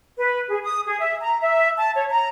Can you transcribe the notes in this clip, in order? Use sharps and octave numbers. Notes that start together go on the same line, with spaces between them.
B4
G#4
D#6
G#4
E5
A#5
E5
A5
C#5
A#5